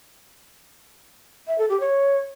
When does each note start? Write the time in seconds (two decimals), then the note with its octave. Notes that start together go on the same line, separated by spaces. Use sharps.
1.47 E5
1.58 A4
1.69 G4
1.80 C#5